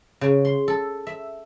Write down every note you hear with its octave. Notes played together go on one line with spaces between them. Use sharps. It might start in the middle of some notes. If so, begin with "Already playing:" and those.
C#3
C6
A4
E5